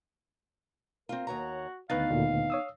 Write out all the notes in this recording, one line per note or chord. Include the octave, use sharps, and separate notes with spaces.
C4 F4 A#4
D#2 F#4 C#5 A#5
D2 D#3 B3 D#4 F5 F#6 A6
D2 A#2
C#5 D#6 E6